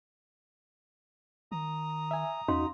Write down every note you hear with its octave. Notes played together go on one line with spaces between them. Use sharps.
D#3 A#5 D#6
E5 G#5
E2 C#4 D#4 F#4 F5 C6